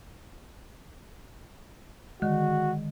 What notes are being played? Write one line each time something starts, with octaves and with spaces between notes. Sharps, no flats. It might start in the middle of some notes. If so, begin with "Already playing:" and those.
D3 D#3 G#3 F#4